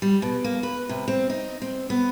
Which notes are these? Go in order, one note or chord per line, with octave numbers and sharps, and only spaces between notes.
G3
B2
A#3
B4
C3
C4
D#4
C4
B3